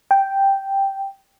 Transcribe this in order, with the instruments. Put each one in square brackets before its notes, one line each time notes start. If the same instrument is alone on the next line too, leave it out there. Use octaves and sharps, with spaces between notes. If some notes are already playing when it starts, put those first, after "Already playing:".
[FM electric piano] G5